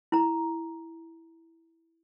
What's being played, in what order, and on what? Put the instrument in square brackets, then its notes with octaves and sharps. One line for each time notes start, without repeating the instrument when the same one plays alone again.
[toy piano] E4 A#5